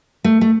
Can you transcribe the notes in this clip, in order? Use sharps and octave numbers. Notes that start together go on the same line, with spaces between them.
A3
A3